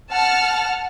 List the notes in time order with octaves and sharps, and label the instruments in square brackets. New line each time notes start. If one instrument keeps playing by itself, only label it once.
[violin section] F#5 A5 F6